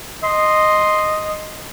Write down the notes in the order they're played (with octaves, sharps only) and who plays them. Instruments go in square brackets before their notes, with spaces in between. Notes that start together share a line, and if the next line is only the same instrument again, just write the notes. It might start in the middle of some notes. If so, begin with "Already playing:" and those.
[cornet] D#5 [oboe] C6